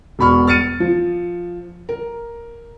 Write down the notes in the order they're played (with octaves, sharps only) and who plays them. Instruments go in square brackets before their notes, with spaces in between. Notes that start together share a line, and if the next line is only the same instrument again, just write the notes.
[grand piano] E1 B2 B5 C#6 F6
F6 A6 C#7 D#7
F3
A#4